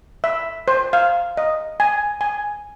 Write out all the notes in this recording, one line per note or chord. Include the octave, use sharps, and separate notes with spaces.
E5
C5
F5
D#5
G#5
G#5